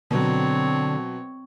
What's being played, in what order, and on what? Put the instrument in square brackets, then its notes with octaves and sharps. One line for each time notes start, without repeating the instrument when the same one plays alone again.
[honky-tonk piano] B2 F#3 [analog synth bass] D3 [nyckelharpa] C4 C#5